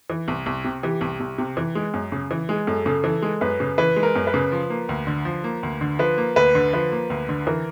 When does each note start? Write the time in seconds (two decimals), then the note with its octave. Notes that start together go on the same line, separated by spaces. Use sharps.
0.10 E3
0.28 C2
0.46 C2
0.64 C3
0.83 E3 G4
1.01 C2
1.20 C2
1.38 C3
1.57 E3
1.75 G#3
1.94 F#2
2.12 C#3
2.31 E3
2.49 G#3 G#4
2.67 F#2 A4
2.86 C#3 A4
3.04 E3 A4
3.22 G#3
3.41 F#2 B4
3.60 C#3
3.78 E3 B4
3.96 G#3
4.03 A#4
4.15 F#2
4.27 B4
4.34 C#3
4.52 F3
4.70 A#3
4.89 D2
5.07 D3
5.25 F3
5.44 A#3
5.63 D2
5.81 D3
5.99 F3 B4
6.17 A#3
6.36 D2 B4
6.55 D3
6.73 F3 B4
6.92 A#3
7.10 D2
7.29 D3
7.47 E3 A#4